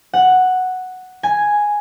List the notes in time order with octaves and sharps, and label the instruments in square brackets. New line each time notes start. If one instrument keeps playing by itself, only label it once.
[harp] F#5
G#5